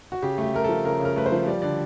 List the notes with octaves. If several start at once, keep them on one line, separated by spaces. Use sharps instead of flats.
F#4
C#3 G4
A3 G4
A3 A#4
F3 A4
C#3 A#4
C#3 A#4
A3 B4
C5
F3
G3 D5
D3 D5